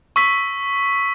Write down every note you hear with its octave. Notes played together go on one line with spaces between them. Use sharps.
C#6 E6 B6